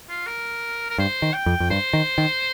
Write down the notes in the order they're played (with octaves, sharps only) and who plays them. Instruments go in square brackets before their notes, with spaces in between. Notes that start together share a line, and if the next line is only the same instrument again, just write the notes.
[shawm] F4
A#4
A#4
[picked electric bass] G2 [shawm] C5
[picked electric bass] D#3
[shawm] G5
[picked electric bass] F2
F2
[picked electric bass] G2 [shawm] C5
[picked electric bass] D#3
D#3